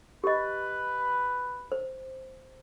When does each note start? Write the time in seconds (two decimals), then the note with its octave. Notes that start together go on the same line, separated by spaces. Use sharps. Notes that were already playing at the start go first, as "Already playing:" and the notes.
0.24 G4 B4 D#5
1.72 C5